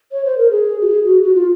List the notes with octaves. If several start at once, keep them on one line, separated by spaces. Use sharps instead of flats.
C#5
C5
A#4
G#4
F#4
G#4
F#4
F#4
F4